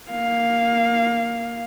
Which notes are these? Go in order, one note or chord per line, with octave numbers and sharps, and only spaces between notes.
A#3 F5